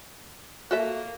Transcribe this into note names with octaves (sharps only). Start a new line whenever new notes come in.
A#3 F#4 A4 E5